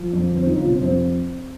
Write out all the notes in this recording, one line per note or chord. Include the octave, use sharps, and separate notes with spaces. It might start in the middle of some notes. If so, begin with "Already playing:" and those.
Already playing: F3
F2
G1
C4
G1 D#4
F4
C3
C4
F2 C4